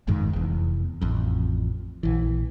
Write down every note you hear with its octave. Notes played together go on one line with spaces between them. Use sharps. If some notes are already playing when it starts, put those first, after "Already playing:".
G1 F2 G#2 D#3
F1 E2
A1 F2
A#1 E3